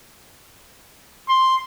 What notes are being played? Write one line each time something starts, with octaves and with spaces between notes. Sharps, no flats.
C6